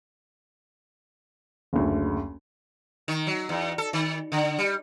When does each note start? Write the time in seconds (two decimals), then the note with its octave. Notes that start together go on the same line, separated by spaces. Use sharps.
1.73 F#1 D2
3.08 D#3
3.27 F#3
3.49 E2
3.78 A4
3.93 D#3
4.32 D3
4.58 G3